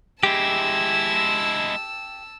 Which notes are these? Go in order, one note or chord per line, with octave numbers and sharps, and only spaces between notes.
G#3 E4 G4 A5 E6